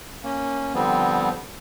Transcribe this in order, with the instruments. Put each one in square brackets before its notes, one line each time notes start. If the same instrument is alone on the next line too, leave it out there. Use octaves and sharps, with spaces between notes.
[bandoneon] A#3 C#4
D3 F3 G3 B3 C4